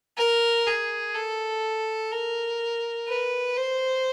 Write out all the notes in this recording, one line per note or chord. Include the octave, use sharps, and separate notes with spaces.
A#4
G#4
A4
A#4
B4
C5